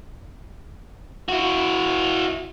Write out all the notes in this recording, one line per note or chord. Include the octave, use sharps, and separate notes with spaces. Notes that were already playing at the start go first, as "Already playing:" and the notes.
E4 F#4